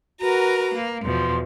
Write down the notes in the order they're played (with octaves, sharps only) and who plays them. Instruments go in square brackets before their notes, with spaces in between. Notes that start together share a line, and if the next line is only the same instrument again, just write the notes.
[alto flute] F#4 [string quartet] A#4 B4 A#5
[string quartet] A#3
[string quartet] E2 B2 F3 [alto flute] C6